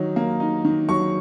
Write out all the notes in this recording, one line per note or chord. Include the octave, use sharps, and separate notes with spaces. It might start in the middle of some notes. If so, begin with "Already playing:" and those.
Already playing: D#3 F#3 D#4
A#3
D#4
D#3
F#3 C#6